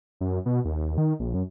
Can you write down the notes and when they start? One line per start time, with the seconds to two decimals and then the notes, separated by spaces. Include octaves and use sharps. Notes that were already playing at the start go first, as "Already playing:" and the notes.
0.21 F#2
0.46 B2
0.65 D#2
0.98 D#3
1.20 A#1
1.34 F#2